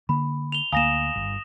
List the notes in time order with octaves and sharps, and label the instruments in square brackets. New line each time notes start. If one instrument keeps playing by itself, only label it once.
[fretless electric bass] D3 A#3 [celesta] B5
[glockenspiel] F7 G7
[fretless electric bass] D2 A#3 [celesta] F5 G#5 A#5 [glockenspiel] D#6 A#6 E7
[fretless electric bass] G1